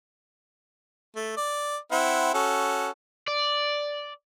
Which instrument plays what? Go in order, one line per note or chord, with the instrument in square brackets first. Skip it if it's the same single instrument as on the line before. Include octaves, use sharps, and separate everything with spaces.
[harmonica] A3
D5
C4 E4 F#5
C#4 F#4 A4
[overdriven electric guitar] D5